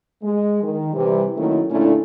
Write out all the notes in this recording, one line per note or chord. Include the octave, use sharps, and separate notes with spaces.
G#3
D#3
C3 E3 G3
D#3 F#3 A3 A#3 C#4 E4
A#2 D3 A3 C#4 D4 E4